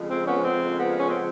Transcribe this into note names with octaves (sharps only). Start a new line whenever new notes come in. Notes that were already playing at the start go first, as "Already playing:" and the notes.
Already playing: F2 C#3 F3 G#3
C4
B3 C#4
C4
B3
C#4
C4